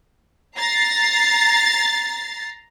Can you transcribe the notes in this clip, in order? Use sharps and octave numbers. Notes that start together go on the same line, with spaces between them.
A#5 A6 C7